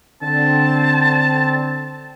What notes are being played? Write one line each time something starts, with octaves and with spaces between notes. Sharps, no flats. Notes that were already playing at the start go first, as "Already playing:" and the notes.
D3 C4 A5